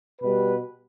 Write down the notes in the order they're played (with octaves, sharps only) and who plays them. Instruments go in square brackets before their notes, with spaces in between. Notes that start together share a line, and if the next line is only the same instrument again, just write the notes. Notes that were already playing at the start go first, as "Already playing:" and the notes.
[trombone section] B2 G3 B4